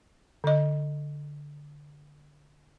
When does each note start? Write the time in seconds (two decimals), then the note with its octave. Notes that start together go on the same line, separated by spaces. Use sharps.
0.44 D3 D#5